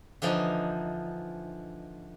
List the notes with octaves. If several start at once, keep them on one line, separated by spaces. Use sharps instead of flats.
D3 E3 F3 D#4